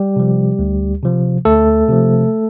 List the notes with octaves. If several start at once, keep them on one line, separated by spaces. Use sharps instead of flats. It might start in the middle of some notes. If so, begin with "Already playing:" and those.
Already playing: G3 G4
C3 F3
D2
C3 F3
D2 A3 A4
C3 F3